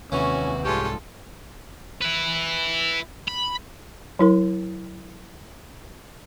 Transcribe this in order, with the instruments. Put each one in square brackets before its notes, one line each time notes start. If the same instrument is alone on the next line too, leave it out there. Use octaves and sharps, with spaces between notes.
[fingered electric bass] D#2 C3 [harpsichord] E3 [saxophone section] C#4 [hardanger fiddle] F#4
[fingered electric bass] C2 G#2 [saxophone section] G#3 C#4 G4 [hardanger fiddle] F4 A4
[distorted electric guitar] E4 B4
B5
[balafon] F#3 E4 A#4